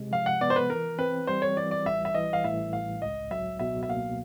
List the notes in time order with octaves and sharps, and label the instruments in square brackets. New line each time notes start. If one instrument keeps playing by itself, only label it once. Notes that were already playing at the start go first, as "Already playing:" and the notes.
Already playing: [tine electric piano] C3 G#3
[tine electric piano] F3 [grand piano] F5
[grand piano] F#5
[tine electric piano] B3 [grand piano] D5
[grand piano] C5
B4
[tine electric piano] E3 [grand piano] A#4
[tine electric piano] C4 [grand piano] B4
[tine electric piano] G3 [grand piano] C5
[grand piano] C#5
[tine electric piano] E3 [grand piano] D5
[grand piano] D5
[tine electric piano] A1 [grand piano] E5
[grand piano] E5
[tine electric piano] E3 [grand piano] D#5
[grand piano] F5
[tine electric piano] A2 [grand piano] E5
[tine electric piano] A1 [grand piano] F5
[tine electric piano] C#2 [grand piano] D#5
[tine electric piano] F#3 [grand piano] E5
[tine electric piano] B2 [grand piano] E5
[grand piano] E5
[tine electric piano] A#3 [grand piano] F5